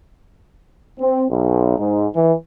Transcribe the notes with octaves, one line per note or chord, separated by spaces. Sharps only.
C4
B1
G#2
E3